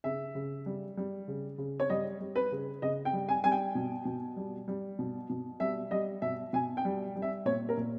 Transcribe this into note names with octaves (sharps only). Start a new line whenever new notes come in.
C#3 E5
C#3
G3
G3
C#3
C#3
C#5
G3 D#5
G3
B4
C#3
C#3 D#5
G5
G3
G#5
G3 G#5
G5
B2
B2
G3
G3
B2
B2
G3 E5
G3 D#5
B2 E5
B2 G#5
G5
G3
G3
E5
A#2 C#5
A#4
A#2